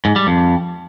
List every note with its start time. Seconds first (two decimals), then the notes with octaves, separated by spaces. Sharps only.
0.05 G#2
0.16 G3
0.27 F2